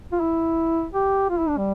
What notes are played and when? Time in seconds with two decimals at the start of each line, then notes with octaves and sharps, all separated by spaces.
0.12 F4
0.20 E4
0.93 G4
1.30 F4
1.39 E4
1.48 D4
1.57 G3